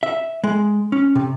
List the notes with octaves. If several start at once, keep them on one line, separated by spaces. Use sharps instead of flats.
E5
G#3
C#4
C3